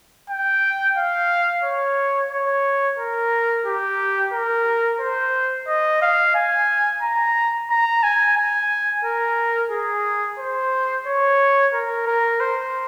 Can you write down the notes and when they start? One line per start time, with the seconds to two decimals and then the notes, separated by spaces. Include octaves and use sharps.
0.30 G5
0.97 F5
1.64 C#5
2.31 C#5
2.99 A#4
3.65 G4
4.33 A#4
5.00 C5
5.67 D#5
6.02 F5
6.35 G#5
7.02 A#5
7.70 A#5
8.03 G#5
8.38 G#5
9.05 A#4
9.71 G#4
10.39 C5
11.06 C#5
11.73 A#4
12.07 A#4
12.40 C5